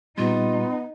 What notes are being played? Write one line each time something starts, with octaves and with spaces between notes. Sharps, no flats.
A#2 G3 B3 D#4 F4